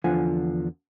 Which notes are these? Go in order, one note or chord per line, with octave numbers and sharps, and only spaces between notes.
E2 D3 F3 F4 F#5 G#5